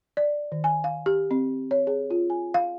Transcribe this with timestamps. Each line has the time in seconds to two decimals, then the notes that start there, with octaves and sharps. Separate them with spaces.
0.17 D5
0.52 D#3
0.64 G#5
0.84 F5
1.06 G4
1.31 C4
1.71 C#5
1.87 G#4
2.10 F4
2.30 G#5
2.54 F5